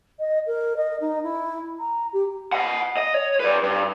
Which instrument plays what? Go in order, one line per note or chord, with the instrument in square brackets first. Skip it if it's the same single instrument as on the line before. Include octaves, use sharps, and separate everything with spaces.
[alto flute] D#5
A#4
D#5
D#4
E4
A#5
G4
[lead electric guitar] D#5 F#5
D#5
C#5
B4 D5
G2